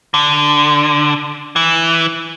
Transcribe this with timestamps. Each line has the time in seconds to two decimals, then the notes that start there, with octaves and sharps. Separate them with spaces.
0.14 D3
1.56 E3